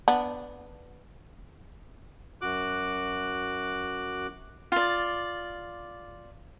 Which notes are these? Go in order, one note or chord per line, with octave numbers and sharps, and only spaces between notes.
B3 D4
F#2 F#4 D6 F#6
F4 D5